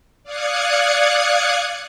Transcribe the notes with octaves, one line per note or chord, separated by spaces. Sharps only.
D5 F5 D#6 F#6 G#6 C#7